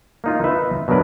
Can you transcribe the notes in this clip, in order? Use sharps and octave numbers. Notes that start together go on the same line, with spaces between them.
A#3 D#4 F4
D#4 B4 E5
B2 F#3 D4 A#4 B4